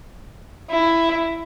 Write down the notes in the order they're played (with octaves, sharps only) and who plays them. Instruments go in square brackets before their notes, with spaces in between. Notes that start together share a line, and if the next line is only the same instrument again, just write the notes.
[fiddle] E4